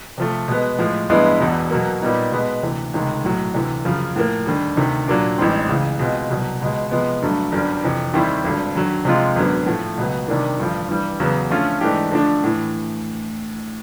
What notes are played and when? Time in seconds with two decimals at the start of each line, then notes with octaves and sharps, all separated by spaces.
0.18 C3 F3 A3
0.48 B2 G#3 B3
0.79 A2 F3 G#3
1.10 G2 E3 G#3 B3 E4
1.41 E1 E2 B2
1.71 B2 F#3 A#3
2.01 A#2 G3 B3 D#4
2.32 B2 G#3 B3
2.63 D2 C3 E3
2.93 C#2 C3 D#3 G#3
3.24 B1 A2 F#3
3.54 D2 C3 E3
3.85 F#2 C#3 F3
4.16 A2 F3 A#3
4.46 D#2 D3 G3
4.77 D2 C3 D#3
5.08 A#2 F#3 A#3 D4
5.38 A1 G#2 E3 G3 C4
5.68 C#2 C#3 E3
5.99 B2 G#3 C4 F4
6.30 C2 B2 F#3
6.60 C#2 B2 G#3
6.91 C3 F3 G#3 B3
7.22 G2 D3 F#3 A3
7.52 G1 F#2 D3 G3
7.83 F2 C3 E3
8.14 D#2 D#3 G3 C4 E4
8.44 G#1 G2 D3
8.75 D#2 D3 F#3
9.05 C3 F3 G#3 C4 F4
9.35 G#1 F#2 D3 F#3 B3
9.66 A2 F3 A3
9.97 C#2 B2 F#3 B3
10.28 C3 D#3 G3 A#3 D4
10.58 A1 G2 D3 F3
10.89 G2 E3 G3
11.20 E2 C#3 F#3 B3
11.50 D3 F3 A3 C#4 F4
11.81 G#2 E3 A3 D4 G4
12.11 D3 F3 A3 D4
12.44 A2 E3